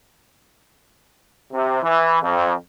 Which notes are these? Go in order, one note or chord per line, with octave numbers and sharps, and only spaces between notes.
C3
E3
F2